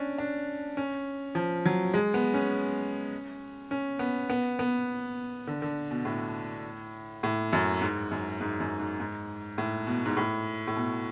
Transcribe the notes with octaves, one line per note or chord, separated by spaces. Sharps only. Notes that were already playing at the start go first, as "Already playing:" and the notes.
Already playing: C#4 D4
D4
C#4
F3
F#3
G#3
B3
C#4
C#4
B3
B3
B3
D3
D3
B2
A2
A2
F#2
G#2
F#2
G#2
F#2
G#2
G#2
A2
B2
G#2
A2
A2
B2